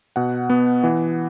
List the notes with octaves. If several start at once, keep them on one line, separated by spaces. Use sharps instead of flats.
B2 F#5
B3
E3